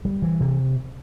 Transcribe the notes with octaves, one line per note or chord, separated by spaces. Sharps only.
G3
E3
C3